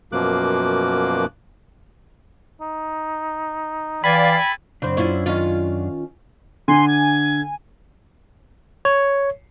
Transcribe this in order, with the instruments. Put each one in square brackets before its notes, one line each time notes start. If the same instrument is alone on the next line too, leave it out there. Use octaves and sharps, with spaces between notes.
[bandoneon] F#2 B2 F3 A#3 D6 F#6
[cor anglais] D#4
[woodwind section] E3 D5 F5 [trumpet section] A4 G#5 [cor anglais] G5 [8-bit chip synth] B5
[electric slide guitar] F#2 D4 [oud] C#3 C4
[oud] C#4 E4 F4
D#3 C#4 F4
[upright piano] D3 [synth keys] G#5 [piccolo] C6
[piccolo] G#6
[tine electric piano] C#5